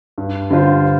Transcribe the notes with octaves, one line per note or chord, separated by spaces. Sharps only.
G2
D3 G3 F4 C5